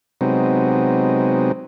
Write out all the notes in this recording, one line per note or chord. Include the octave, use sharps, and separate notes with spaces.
C3 F#3 G#3 B3 C4 D#4